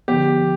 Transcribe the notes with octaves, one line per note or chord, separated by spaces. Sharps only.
D3 F3 B3 G4